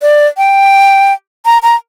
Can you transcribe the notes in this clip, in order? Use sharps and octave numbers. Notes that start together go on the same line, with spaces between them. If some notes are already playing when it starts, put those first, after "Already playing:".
D5
G5
A#5
A#5